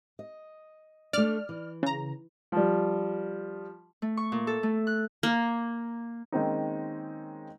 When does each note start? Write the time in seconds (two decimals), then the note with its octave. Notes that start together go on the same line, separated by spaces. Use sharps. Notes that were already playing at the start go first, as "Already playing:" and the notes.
0.19 D#5
1.13 A3 D4 D5 F6
1.49 E3
1.83 C#3 A#5
2.52 F3 G3
4.02 A3
4.17 C#6
4.32 A#2
4.47 A4
4.63 A3
4.87 F#6
5.23 A#3
6.32 D#3 G#3 A#3 C4 C#4 D#4